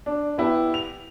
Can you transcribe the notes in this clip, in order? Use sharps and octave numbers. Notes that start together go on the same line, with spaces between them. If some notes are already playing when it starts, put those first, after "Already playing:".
D4
B3 E4 G4 B4
F7